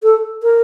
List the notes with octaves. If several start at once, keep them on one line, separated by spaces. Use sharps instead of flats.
A4
A#4